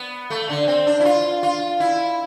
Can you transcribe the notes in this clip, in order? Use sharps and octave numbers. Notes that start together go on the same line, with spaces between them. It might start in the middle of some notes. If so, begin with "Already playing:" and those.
Already playing: B3
A3
D3
C4
D4
E4
F4
F4
E4